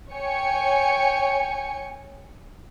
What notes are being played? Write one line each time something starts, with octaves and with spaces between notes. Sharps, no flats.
C#5 G5 G#5 C#7